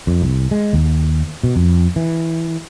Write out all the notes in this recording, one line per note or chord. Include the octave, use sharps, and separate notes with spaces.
F2
C2
G#3
D#2
B2
F2
E3